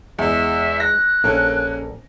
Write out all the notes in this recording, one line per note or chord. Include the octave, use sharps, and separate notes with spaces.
E2 G#3 E5
F#6 A#6
A#1 A#3 C#4 A4